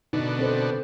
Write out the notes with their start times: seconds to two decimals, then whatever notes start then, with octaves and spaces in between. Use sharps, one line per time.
0.13 B2 D3 D#4
0.39 C4 A4 C5